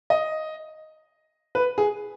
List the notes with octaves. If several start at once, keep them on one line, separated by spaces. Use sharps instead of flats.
D#5
B4
G#4